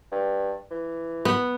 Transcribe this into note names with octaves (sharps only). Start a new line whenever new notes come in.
G2
E3
B3